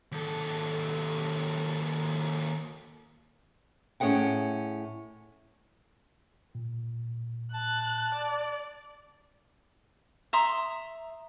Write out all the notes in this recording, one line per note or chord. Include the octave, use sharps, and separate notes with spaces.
D#2 A4
A2 C#4 F#4 G#4 F#5 G5
A#2
A5 F#6
D5
E5 A#5 C6 D#6